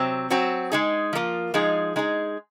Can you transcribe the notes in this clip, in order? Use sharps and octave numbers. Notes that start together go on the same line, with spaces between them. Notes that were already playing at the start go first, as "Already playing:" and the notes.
Already playing: C3 F#3 C4
F#3 C4 F#4
G#3 D#4 G#4
F3 A#3 F4
F3 G#3 D#4 G#4
G#3 D#4 G#4